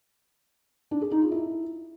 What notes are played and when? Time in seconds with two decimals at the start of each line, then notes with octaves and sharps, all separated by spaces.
0.91 D4
1.01 G#4
1.11 D#4
1.22 F4
1.32 E4